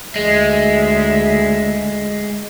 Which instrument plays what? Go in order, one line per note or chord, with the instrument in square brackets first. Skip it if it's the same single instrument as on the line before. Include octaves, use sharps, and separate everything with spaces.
[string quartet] D2 E5 [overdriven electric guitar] G#3